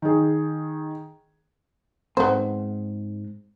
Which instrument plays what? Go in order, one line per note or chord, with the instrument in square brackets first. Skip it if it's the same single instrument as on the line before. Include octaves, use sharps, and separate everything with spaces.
[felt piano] D#3 G#4
[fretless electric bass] G#2 G#3 C4 [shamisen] B3 C5